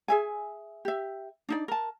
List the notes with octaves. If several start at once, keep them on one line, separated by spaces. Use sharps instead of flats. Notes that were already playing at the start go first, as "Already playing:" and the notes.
G#4 E5 G#5
G4 E5
D4 D#4 D5
A#4 A5